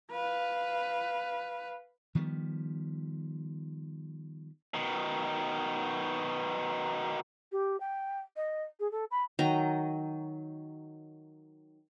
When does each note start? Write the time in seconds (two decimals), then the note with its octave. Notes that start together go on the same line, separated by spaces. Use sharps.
0.11 B4 F5
2.15 D#3 F3 G3 B3
4.74 B2 D#3
7.52 G4
7.80 G5
8.36 D#5
8.80 G#4
8.91 A4
9.11 B5
9.39 D#3 F#3 D#5 A#5